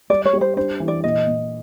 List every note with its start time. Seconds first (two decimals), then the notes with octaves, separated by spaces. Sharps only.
0.10 G3 D5
0.25 C#5
0.33 G3
0.41 C5
0.56 D4 C5
0.80 E3
0.88 D5
1.04 A#2 D#5
1.26 A#2